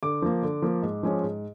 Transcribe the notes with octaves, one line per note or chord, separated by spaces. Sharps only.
D3 D6
F3 A#3
D3
F3 A#3
G#2
F3 G#3 C#4
G#2